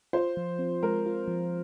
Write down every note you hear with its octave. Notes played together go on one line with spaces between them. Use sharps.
F4 C5
F3
C4
G#3 A#4
F4
F3